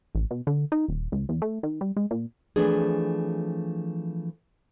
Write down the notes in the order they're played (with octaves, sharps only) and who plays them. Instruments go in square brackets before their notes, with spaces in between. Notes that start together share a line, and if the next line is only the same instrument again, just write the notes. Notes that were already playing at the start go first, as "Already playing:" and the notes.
[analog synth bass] A1
B2
D3
D#4
D#1
C#2
E2
A3
D#3
G3
G#3
A#2
[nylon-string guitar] E3 F3 A3 C4 D4 G#4